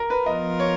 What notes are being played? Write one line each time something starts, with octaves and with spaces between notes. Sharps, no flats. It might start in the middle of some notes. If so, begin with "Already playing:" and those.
Already playing: A#4
B4
F3 B3 F4 A#4 D#5
C#5